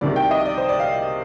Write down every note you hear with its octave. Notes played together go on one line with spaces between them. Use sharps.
C2 C3 D#3 D5
G5
D#5
D5
C5
D5
F5